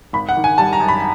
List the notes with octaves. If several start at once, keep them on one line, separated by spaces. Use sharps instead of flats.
G#1 B5
F#5
D#3
G#5
G3 A5
A#5
F#2
B5